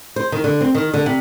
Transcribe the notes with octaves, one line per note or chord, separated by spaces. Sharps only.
C5
D#3
D3
C4
D#3
D3
C3